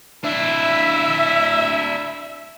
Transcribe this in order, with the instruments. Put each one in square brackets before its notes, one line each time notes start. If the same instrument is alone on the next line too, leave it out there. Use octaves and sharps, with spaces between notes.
[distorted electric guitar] D4 E4 [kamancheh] E5